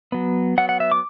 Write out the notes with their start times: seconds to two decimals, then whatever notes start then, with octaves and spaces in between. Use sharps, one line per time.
0.12 F#3 B3
0.58 F#3 B3 F#5
0.69 F#5
0.80 E5
0.92 D6